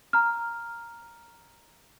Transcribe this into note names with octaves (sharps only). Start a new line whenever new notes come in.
A#5 F6